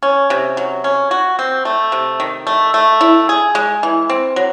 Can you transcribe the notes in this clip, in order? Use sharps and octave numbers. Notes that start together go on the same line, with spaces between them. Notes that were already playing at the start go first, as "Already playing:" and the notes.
C#4
C3
F#3
C#4
F#4
C4
A3
C3
D#3
A3
A3
E4
G#4
G#3
E3
C4
F#3